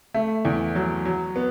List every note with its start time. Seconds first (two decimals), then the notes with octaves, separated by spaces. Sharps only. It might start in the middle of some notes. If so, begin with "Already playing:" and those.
0.14 A3
0.45 E2
0.75 F#3
1.05 F#3
1.36 B3